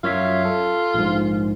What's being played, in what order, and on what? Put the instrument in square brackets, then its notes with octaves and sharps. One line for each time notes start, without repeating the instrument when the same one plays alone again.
[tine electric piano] F#2 C#5 E5 [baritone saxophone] F4
[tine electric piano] A4
A#1 G#2